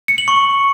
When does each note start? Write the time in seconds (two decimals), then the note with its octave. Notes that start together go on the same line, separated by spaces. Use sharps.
0.08 C#7
0.18 F#7
0.28 C#6